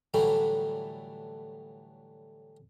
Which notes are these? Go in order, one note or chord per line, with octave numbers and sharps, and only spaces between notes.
A2 D3 E3 F#3 G3 A3